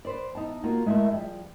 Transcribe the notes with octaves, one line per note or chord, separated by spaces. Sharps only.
B4 C5 D5
E2 D#4 A5
A#3 F4 F#4
G#3 A3 E4 A#4 E5
F3 G3 G#4